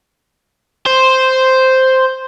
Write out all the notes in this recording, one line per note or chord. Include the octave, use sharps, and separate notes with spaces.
C5